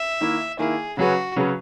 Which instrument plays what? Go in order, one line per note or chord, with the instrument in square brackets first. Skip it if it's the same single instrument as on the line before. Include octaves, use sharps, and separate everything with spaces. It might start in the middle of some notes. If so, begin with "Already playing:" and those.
Already playing: [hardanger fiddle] E5
[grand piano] D#3 A#3 E4
[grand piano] D#3 A#3 E4 [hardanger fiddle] G#4
[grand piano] C#3 F#3 C#4 G#4 B4 [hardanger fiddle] F#4
[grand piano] C#3 F#3 C#4 G#4 B4